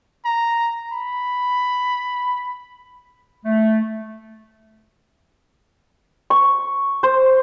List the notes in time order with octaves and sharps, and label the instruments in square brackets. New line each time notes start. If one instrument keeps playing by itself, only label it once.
[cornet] A#5
B5
[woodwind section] A3
[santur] C#6
C5